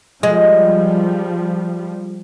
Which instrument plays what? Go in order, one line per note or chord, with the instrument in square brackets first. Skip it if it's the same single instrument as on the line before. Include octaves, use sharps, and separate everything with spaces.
[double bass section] F3 G3 [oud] G#3